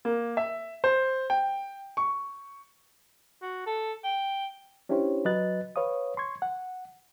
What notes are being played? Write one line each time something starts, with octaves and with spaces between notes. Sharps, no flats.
A#3
E5
C5
G5
C#6
F#4
A4
G5
C#4 D4 E4 G4 C5 C#5
F#3 B4 D#5 F#6 A6
B4 C#5 F5 D#6
C6 C#6 G#6
F#5